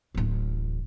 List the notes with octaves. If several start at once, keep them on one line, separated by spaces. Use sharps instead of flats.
D1 A1